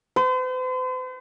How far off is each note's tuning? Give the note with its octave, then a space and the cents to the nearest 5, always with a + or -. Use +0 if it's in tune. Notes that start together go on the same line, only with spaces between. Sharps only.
C5 -45